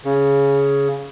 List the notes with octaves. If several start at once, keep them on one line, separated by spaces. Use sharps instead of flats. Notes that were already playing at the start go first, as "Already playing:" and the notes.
C#3